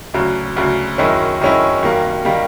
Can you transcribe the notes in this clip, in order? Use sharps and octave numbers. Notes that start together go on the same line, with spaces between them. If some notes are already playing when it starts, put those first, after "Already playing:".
D2 C#3 F#3
D2 C#3 F#3
F#2 D#3 G#3 C#4 E4
F#2 D#3 G#3 C#4 E4
F#2 D#3 G3 A#3
D#3 G3 A#3